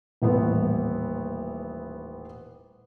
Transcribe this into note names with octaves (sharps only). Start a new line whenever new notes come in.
D#1 A1 B3